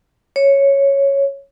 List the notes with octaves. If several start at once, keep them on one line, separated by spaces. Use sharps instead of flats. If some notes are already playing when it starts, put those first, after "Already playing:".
C#5